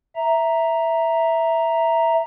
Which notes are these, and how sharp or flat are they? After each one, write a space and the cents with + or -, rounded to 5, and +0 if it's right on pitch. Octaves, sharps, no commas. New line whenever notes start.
E5 +0 A#5 +0